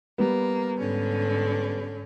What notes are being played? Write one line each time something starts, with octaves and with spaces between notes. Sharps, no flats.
G3 A#3 B3
G#2 D3 C#4